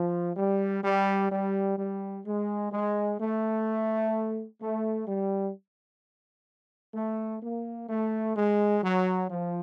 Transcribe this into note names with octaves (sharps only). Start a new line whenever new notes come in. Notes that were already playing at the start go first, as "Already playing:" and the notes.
Already playing: F3
G3
G3
G3
G3
G#3
G#3
A3
A3
G3
A3
A#3
A3
G#3
F#3
F3